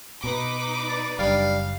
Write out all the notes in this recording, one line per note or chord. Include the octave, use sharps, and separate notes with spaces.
B2 D#4 B4 D6
D5
F#1 G3 D4 F5